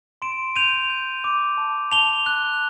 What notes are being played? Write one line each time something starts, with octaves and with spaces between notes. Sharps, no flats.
C6 D7 E7
G6 D#7 F7
G6
D6
A5
A5 F7 G7
F#6